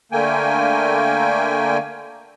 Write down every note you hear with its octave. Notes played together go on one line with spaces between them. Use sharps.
D3 A3 A#3 G5 G#5